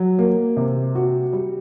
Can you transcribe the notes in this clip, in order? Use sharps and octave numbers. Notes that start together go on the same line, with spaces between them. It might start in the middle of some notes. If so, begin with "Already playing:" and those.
Already playing: F#3
A#3
C3
F#4
G3